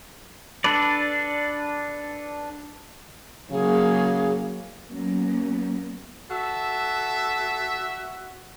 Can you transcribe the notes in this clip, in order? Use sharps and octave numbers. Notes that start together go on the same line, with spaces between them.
D4 A4 B4 D5
C#3 F#3 A#3 G#4
F#3 A#3 B3 C#4
F#4 A4 E5